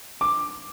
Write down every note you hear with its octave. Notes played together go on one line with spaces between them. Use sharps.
D6